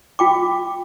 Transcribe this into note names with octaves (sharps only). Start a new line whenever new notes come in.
F4 G5 D6